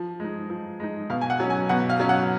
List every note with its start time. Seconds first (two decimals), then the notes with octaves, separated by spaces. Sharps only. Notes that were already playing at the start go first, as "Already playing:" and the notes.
Already playing: F3
0.20 G#3 D#4
0.50 F3
0.80 G#3 D#4
1.10 B2 F5
1.21 G#5
1.30 F#5
1.40 F#3 C#4
1.50 G#5
1.69 B2 F#5
1.90 F5
2.00 F#3 C#4
2.09 F#5